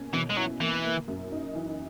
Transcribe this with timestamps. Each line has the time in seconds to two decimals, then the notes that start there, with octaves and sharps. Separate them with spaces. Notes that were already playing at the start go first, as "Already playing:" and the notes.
Already playing: B2 A#3 C#4
0.13 B2 E3
0.30 G#3
0.37 F#3 E4
0.61 E3 A#3
0.84 A#3
1.08 F#2
1.32 D#4
1.55 E3